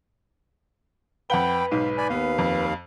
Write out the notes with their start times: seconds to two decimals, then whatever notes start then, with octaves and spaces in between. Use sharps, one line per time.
1.30 F2 B4 F#5 G5 B5 G7
1.71 B1 G#2 F5
1.98 D5 G#5 B5
2.10 D#2 B3 F5
2.38 F2